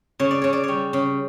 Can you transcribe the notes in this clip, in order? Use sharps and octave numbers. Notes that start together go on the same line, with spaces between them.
C#3 C#5
D5
C#3 C#5
D5
G3 C#5
C#3